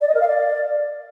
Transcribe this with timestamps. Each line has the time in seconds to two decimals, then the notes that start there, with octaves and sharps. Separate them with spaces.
0.01 D5
0.07 D#5
0.14 A#4
0.21 F5
0.27 D5